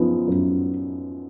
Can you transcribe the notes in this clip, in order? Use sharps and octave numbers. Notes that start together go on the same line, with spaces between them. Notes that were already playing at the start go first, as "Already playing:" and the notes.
Already playing: F#2 F3 B3 D#4
F#2